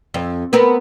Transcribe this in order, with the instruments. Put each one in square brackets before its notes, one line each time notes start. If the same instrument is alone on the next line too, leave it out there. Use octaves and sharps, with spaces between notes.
[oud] F2
B3 C4 A#4